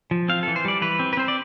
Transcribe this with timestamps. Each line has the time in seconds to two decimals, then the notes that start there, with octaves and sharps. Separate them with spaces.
0.11 F3
0.29 C4 F5
0.43 A4
0.47 E3
0.56 C5
0.65 G3 D5
0.82 E3 B4
0.99 C4
1.13 B4
1.17 C4 C5
1.28 D5